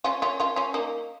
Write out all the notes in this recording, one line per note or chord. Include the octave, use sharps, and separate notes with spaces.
C#4 F4
C#4 F4
C#4 F4
C#4 F4
A#3 D#4